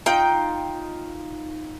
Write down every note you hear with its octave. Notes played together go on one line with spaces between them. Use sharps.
D#4 F4 G5